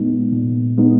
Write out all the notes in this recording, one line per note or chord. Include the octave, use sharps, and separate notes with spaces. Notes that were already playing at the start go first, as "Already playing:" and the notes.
Already playing: A#2 G#3 B3 D#4
A#2
G#3 B3 D#4